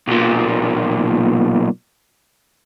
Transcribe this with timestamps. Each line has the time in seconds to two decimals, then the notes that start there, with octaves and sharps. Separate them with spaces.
0.08 B1 A#2